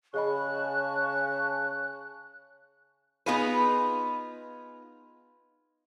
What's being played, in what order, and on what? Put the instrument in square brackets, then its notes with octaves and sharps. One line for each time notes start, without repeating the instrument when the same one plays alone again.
[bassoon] C#3 [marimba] G#4 D#5 B5 [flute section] G#5 A5 C#6 [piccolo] F#6
[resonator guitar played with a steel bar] B3 D#4 F4 G#4 B4